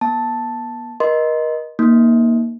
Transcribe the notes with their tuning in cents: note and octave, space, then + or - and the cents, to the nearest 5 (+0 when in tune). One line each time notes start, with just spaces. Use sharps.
B3 -40 A5 +0
A#4 +35 D#5 +0 C6 +0
A#3 +5 D#4 +0